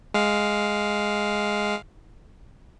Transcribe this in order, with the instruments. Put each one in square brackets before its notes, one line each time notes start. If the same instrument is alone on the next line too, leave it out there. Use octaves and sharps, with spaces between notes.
[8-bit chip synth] G#3 F5